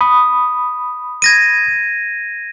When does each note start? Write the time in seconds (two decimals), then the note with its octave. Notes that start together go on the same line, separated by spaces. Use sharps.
0.01 B5 D#6
1.22 G#6 A#6 D#7